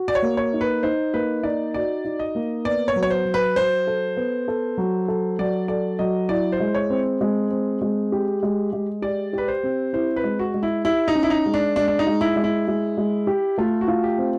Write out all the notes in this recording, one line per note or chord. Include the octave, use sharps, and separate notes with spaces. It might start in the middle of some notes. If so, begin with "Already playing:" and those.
Already playing: F#4
D5
C#5
A#3
C#5
D#4
B4
D#4 C5
A#3 B4
D#4 D5
F#4 D5
D#4
D#5
A#3
B3 D5
C#5
F#3
C#5
C5
F#3
B4
F#3 C5
A4
B3
A4
F#3
A4
F#3 D5
A4 D5
F#3 D#5
E4 D5
C5
G#3
C#5
C4
G#3
C4
G#3
G4
G#3
G#3
G4 D5
G4 B4
C5
C4
E4 C5
B4
G#3
F#4
G#3
E4
E4 G4
D#4
C#4
E4
D#4
G#3
D4
G#3 D4
D4
D#4
G#3
E4
G#3
E4
G#3
G#3
G4
A3 F4
F#4
F4
G4
C4